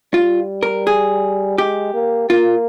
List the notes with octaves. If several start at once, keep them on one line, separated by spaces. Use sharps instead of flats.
G3 F4
A#4
G#4
G#3 G4
A#3
A#3 F4